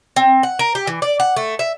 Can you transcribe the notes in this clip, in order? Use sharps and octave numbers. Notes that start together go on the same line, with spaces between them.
C4
F#5
A#4
G4
E3
D5
F#5
A3
E5